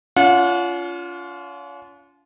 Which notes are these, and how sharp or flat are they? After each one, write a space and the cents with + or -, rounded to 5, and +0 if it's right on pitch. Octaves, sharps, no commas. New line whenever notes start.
C#4 +40 F4 -10 F#5 -35